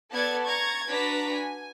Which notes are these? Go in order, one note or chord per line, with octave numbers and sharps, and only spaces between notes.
B3 A4 D5 A5 G#6 A6
A#5 C#6 G#6 A6
D4 F#4 B4 A5 A#5 B6
G#5